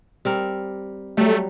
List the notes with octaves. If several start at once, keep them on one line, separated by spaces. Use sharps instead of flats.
G3 C4 A#4
F#3 G3 A3